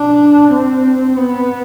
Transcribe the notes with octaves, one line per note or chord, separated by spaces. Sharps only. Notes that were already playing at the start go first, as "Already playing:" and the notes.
Already playing: D4
C4
B3